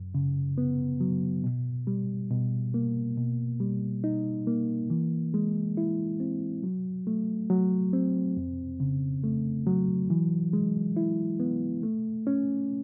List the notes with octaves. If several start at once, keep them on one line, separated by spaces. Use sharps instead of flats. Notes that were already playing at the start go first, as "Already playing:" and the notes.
Already playing: F#2
C#3
B3
F#3
B2
G3
B2
A#3
B2
G3
D#4
A#3
E3
G#3
E4
C4
F#3
A3
F#3
C4
F2
C#3
A3
F#3
E3
G#3
E4
B3
A3
C#4